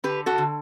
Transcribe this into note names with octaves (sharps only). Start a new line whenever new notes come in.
D3 G4 B4
F#4 A4
D3